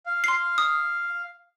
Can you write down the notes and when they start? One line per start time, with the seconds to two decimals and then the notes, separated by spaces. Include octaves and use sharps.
0.06 F5
0.24 C6 C7
0.58 D#6